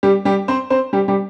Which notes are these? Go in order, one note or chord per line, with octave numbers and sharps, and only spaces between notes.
G3 G4
G3 G4
C4 C5
C4 C5
G3 G4
G3 G4